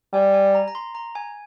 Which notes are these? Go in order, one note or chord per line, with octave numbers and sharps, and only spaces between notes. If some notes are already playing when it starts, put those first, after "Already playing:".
G3 G#5
G#5
A#5
A#5
C6
A#5
G#5